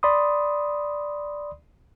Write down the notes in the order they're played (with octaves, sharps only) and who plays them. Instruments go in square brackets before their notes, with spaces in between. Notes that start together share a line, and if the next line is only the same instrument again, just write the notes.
[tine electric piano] D5 B5 C6 D#6